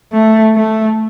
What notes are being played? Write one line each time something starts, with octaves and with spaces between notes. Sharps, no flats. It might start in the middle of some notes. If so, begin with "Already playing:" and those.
A3
A3